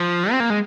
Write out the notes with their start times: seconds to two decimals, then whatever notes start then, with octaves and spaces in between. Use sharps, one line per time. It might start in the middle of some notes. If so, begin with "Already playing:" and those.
Already playing: F3
0.31 C4
0.40 A#3
0.50 G#3